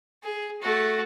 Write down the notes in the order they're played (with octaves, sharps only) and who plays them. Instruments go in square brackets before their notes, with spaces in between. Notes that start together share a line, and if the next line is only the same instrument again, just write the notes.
[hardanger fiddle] G#4
A3 F#4